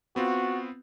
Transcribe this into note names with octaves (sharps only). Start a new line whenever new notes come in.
B3 C4 F4 F#4